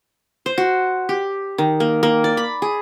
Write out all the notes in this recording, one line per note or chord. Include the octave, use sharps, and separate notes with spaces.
C5
F#4
G4
D#3
A#3
A#3
D5
B5
G#4